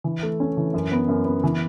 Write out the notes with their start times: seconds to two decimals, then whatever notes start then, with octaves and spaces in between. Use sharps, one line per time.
0.04 E3
0.23 A3
0.40 C#4
0.57 E3
0.74 F#2
0.92 B3
1.08 F#2
1.25 B3
1.44 E3